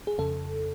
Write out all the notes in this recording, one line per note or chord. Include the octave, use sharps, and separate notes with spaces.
G#4
F2 C#3 A4